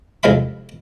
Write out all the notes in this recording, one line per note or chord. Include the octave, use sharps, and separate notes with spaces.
C2 F2 G#3 F5 B5